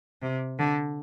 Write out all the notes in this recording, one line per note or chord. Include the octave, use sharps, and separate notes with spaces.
C3
D3